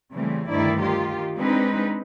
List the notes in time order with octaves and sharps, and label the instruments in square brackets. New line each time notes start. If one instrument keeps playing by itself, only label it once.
[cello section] C#3 E3 G3 A3 C4
D2 G2 D#3 E4 D5
D#3 F4 G4
G#3 C4 D4 D#4 B4